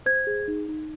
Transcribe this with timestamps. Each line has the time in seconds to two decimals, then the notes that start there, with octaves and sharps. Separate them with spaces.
0.06 C5 G#6
0.27 G#4
0.48 D#4
0.68 D#4